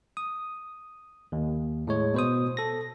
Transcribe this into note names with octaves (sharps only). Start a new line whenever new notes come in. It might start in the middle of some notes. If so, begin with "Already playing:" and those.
D#6
D#2
A2 G#3 C#5
B2 C5 D#6
A4 A#6